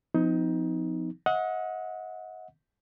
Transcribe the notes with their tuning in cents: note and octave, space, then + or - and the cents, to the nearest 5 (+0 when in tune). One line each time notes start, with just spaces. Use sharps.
F3 +0 C4 -45 D#4 +20
D#5 +35 F#5 -20